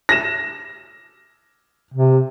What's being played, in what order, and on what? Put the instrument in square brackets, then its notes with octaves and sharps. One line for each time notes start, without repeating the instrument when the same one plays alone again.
[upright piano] A#6 E7
[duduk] C3